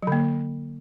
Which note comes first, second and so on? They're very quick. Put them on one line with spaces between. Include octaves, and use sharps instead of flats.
F#3 D3 A#3